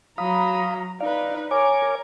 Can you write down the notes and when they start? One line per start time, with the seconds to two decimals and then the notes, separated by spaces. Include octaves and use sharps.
0.18 F#3 F5 A#5 B5 D#6
1.00 D#4 B4 D5 F5
1.51 A#4 C#5 G#5 D6